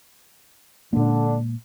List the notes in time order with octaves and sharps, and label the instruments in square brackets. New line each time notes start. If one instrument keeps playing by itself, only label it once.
[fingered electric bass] A#2 G#3 A#3 [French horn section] D3 D4